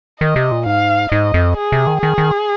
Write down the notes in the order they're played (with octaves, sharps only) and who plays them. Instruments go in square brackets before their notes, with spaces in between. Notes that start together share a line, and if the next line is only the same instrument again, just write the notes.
[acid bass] D#3 [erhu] D#5
[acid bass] C3
A#2
[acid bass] G#2 [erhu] F5
[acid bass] G#2 [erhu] D#5
[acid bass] F2
[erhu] G#4
[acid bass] C3
D#3
[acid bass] D#3 [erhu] G#4
[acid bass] D#3